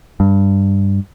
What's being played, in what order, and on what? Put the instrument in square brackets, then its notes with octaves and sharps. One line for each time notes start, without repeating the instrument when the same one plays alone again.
[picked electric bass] G2